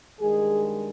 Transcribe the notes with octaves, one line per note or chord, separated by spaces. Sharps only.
G2 D#3 G#3 G#4